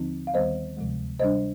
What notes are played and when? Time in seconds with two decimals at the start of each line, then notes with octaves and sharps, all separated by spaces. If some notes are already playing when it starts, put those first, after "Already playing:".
Already playing: D#2 D3 F3 C4 D#4
0.27 F5
0.34 D#2 D#3 G3 B3 C5 D#5
0.77 D2 C3 F3 G#3
1.20 C3 G3 D4 C5 D#5